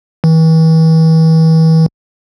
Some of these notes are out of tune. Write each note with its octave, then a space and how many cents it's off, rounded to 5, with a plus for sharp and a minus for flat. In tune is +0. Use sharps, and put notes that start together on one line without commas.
E3 -40